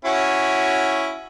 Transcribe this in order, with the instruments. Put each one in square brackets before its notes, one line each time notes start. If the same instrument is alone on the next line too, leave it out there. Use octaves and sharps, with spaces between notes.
[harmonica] C#4 E4 F#4